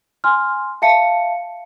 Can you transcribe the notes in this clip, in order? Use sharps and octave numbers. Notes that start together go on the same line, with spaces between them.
G#5 C6 F6
E5 F5 A5 C#7